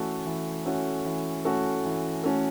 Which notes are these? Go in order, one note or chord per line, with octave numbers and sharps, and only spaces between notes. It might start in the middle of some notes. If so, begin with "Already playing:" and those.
Already playing: E3 A3 C#4 F#4 A4
E3
A3 C#4 F#4 A4
E3
A3 C#4 F#4 A4
E3
A3 C#4 F#4 A4